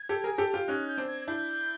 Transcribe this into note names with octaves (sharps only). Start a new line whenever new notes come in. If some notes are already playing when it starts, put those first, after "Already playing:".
Already playing: G#6
G4 A4
G#4 A#4
G4 A4
F4 G4
C#4 D#4 F#6
G6
C4 D4
G#6
D4 E4 G6